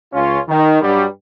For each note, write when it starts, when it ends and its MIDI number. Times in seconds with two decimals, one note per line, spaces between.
0.13 0.39 37
0.13 0.39 61
0.13 0.39 65
0.49 0.81 51
0.82 1.05 43
0.82 1.05 54
0.82 1.05 55